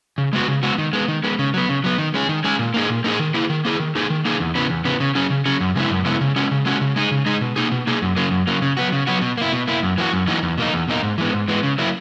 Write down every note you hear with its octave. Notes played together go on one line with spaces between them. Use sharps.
C#3
G#3 B3 F#4
C#3
G#3 B3 F#4
D#3
G#3 B3
D#3
G#3 B3
C#3
F#3 B3
C#3
F#3 B3
D#3
G#3 C#4 G#4
D#3
G#3 C#4 G#4
A#2
A#3 D#4 G#4
A#2
A#3 D#4 G#4
D#3
A#3 E4 G#4
D#3
A#3 E4 G#4
D#3
A#3 D#4 G#4
D#3
A#3 D#4 G#4
E2
C#3 E3 B3
E2
C#3 E3 B3
C#3
F#3 C#4 G#4
C#3
F#3 C#4 G#4
F#2
C#3 G#3 B3 E4
F#2
C#3 G#3 B3 E4
C#3
G#3 C#4 F#4
C#3
G#3 C#4 F#4
C#3
G#3 D#4 G#4
C#3
G#3 D#4 G#4
B2
A#3 D#4 G#4
B2
A#3 D#4 G#4
F#2
C#3 F#3 A#3
F#2
C#3 F#3 A#3
C#3
F#3 B3 F#4
C#3
F#3 B3 F#4
B2
A#3 E4
B2
A#3 E4
F#2
E3 A#3 D#4 F#4
F#2
E3 A#3 D#4 F#4
E2
B2 A#3 D#4
E2
B2 A#3 D#4
G#2
E3 G#3 B3
G#2
E3 G#3 B3
C#3
F#3 A#3 E4